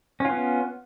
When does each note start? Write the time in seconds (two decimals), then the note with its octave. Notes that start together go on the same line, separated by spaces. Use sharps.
0.20 C#4
0.25 F4
0.30 B3